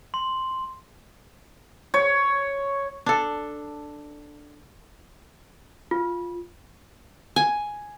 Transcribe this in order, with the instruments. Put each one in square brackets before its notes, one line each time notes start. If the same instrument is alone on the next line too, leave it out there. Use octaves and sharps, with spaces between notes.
[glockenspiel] C6
[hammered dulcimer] C#5
[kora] D4 A4
[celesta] F4
[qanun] G#5